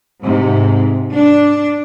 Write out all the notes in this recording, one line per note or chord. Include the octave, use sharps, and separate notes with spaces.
G#2 C3
D4